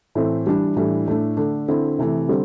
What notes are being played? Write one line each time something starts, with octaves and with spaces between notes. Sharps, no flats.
A2 E3 A3 C4
E3 G3 D4
A2 E3 G3 D4
A2 A3 D4
D3 A3 D4
D3 C4 E4
C3 E3 A3
D3 G3 C4